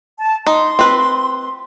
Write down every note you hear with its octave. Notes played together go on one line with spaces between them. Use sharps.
A5
D#4 C6
C4 B4